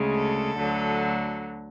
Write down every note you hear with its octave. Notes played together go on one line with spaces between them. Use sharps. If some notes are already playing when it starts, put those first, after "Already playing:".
Already playing: D2 C#3 G#3
A4
D2 D3 F#3